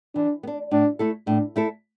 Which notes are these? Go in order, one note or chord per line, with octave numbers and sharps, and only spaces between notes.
E3 D4
B3
D4
A2 D4
A3 E4 A4
A2 D4
A3 E4 A4